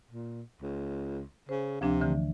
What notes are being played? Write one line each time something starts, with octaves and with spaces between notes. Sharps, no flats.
A#2
C#2
C#3 C5
D2 C3 F3 D4
D3 E3 A3